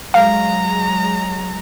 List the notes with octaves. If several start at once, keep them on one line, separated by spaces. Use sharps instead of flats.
F#3 G#3 F5 A#5